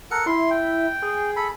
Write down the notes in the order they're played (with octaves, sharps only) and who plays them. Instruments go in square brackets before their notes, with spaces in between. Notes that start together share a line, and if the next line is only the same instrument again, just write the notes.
[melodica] A4 A#4 F#5 [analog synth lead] C#7
[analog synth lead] E4 [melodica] C6
[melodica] G5
[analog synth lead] G#4
[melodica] A4 B5